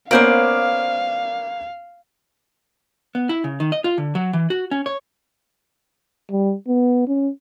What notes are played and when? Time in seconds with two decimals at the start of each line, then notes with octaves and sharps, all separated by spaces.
0.11 A#3 B3 C#4 A#4 C5 D5 F5
3.15 B3
3.29 E4
3.44 C#3
3.60 D#3
3.72 D#5
3.84 F4
3.98 D3
4.15 F#3
4.33 E3
4.50 F#4
4.71 C#4
4.86 C#5
6.31 G3
6.68 B3
7.08 C#4